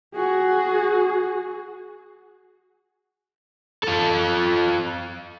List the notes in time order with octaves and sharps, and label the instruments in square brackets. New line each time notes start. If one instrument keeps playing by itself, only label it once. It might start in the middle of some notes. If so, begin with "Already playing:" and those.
[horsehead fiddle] F#4 G#4
[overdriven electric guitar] F4 A4